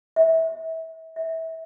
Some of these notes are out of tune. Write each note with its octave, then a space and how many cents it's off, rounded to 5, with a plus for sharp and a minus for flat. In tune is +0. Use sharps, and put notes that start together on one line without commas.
E5 -30
E5 -25